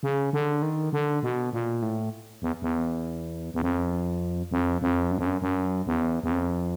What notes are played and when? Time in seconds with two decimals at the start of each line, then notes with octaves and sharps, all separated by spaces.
0.03 C#3
0.33 D3
0.62 D#3
0.93 D3
1.23 B2
1.53 A#2
1.82 A2
2.42 E2
2.62 E2
3.54 E2
3.62 F2
4.51 F2
4.82 F2
5.11 F#2
5.18 F2
5.26 F#2
5.42 F#2
5.86 E2
6.23 E2
6.31 F2